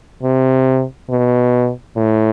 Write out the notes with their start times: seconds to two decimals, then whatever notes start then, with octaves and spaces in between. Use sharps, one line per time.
0.23 C3
1.10 B2
1.97 A2